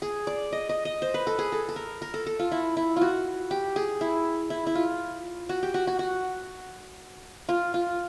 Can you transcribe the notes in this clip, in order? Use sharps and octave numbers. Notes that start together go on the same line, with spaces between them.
G#4
D5
D#5
D#5
D#5
C5
B4
A4
G#4
A4
A4
A#4
A#4
A4
A4
F4
E4
E4
F4 F#4
G4
G#4
E4
E4
E4
F4
F#4
G4
F#4
F#4
F#4
F4
F4